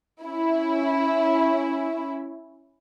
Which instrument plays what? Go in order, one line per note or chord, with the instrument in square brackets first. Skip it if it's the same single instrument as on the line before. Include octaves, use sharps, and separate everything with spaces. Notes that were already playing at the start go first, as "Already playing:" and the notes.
[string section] C#4 E4